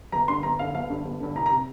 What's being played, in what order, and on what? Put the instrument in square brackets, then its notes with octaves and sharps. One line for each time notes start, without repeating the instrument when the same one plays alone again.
[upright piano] G1 A#5
G2 D3 C6
G1 A#5
G2 D3 F5
G1 F5
G2 D3
G1
G2 D3
C2 A#5
A#5
C3